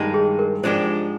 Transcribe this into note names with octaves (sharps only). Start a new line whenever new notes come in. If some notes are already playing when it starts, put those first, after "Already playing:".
Already playing: G2 D#3 G#3 D#4
G#4
A#4
G#2 F3 G#3 D4 G4 C5